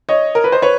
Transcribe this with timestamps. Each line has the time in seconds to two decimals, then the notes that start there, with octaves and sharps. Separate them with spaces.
0.09 C#5 D#5
0.35 A#4
0.44 B4
0.52 C5
0.62 B4 C#5